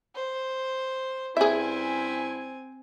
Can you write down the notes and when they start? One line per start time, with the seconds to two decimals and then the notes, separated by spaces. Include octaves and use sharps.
0.15 C5
1.37 G2 C4 C#4 E4 G#4 E5 G#5